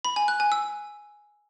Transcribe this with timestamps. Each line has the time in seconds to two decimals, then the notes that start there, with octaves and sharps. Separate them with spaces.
0.05 B5
0.16 G#5
0.28 F#6
0.40 G#5
0.52 E6